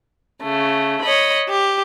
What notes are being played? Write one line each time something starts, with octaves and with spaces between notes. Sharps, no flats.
C#3 A3
C#5 D#5 B5
G4